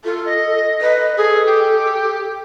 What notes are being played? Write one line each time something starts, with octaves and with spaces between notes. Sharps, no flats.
F4 A4
D#5
B4 D#5
G#4 A4
G4